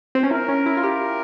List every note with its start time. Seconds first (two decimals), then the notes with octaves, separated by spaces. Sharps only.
0.15 C4
0.23 C#4
0.31 E4 A#4
0.49 C#4
0.66 E4
0.77 F4
0.83 G4 A#4